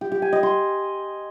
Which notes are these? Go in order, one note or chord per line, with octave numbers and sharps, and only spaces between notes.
G4
G4
G#5
D#5
C6